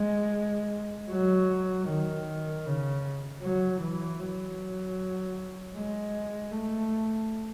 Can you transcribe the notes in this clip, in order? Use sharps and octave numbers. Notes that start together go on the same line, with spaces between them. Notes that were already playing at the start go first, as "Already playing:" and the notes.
Already playing: G#3
F#3
D#3
C#3
F#3
E3
F#3
G#3
A3